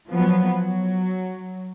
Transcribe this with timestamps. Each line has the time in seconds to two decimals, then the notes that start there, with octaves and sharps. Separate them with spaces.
0.10 F3 F#3 B3
0.57 F#3